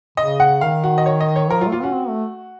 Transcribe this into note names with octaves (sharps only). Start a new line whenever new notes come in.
C#3 D#5
F#5
D#3 F5
F#4
D#5
C#5
D#5
C#5
F3 A#4
F#3 F4
A3
A#3 F4
C#4 F#4
C4
A3